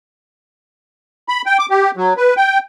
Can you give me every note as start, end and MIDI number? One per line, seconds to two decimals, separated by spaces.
1.29 1.42 83
1.46 1.57 79
1.59 1.66 86
1.70 1.91 67
1.97 2.13 54
2.17 2.34 71
2.37 2.58 79